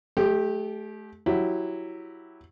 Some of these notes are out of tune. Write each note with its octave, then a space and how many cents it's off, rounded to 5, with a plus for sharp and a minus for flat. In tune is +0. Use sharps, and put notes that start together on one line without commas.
A3 -35 G4 +0
F#3 +0 E4 +0 G4 +0